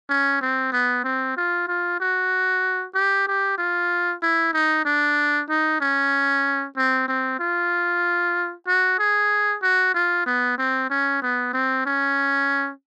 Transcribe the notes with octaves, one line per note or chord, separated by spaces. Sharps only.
C#4
C4
B3
C4
F4
F4
F#4
G4
G4
F4
E4
D#4
D4
D#4
C#4
C4
C4
F4
F#4
G#4
F#4
F4
B3
C4
C#4
B3
C4
C#4